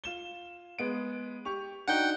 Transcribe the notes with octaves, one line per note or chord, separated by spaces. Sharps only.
F4 E7 G7
G#3 B3 D7
G4 C#6 F7
D4 D#4 F#4 F#5 G5 G6